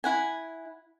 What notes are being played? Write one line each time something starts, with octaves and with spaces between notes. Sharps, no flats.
E4 F#5 G#5